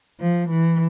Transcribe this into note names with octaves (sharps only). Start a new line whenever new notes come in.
F3
E3